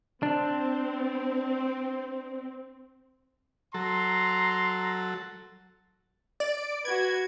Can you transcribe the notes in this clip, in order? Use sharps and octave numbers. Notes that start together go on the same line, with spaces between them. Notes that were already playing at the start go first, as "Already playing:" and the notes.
C4 D4
F#3 A4 A#5 C6
D5
F#4 B4 G#6